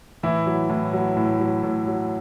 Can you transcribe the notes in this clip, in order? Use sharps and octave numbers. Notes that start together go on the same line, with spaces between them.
A2 E3 E4
F#3
A2
F#3
A2
F#3
A2
F#3